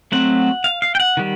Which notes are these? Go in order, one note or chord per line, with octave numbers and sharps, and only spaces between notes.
F#3 A3 C4 F#5
F5
F5
G5
F#5
D#3 G3